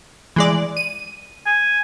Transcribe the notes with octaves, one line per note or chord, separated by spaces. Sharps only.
E3 G#3 D5
D#7
G#5